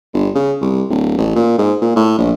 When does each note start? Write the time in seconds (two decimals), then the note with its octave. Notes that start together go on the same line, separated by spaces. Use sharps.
0.14 G1
0.35 C#3
0.61 C2
0.90 D1
1.18 A1
1.36 A#2
1.58 G#2
1.81 A#2
1.96 A2
2.18 A#1